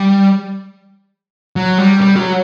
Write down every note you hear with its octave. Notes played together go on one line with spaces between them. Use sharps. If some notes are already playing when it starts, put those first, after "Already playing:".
Already playing: G3
F#3
G3
G3
F#3